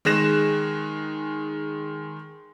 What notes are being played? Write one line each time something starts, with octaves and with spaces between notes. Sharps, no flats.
D#3 G#3 G#4 F#6 A#6 E7